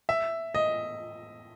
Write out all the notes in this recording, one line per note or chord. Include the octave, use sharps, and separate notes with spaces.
E5
D#5